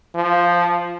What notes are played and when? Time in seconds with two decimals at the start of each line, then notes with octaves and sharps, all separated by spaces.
0.15 F3